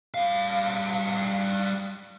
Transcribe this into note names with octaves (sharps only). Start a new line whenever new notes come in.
G3 F5